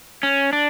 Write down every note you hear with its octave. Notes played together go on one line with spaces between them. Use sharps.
C#4
D4